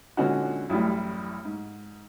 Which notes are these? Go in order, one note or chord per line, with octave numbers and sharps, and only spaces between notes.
A#2 D3 G#3 C#4 D#4 F#4
A1 F#2 A2 G3
G#2